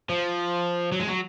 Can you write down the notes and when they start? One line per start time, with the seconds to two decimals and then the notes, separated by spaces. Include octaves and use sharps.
0.09 F3
0.92 F#3
1.00 G#3
1.08 F#3